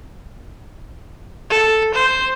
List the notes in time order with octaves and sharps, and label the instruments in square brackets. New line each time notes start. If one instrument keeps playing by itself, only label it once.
[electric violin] A4
C5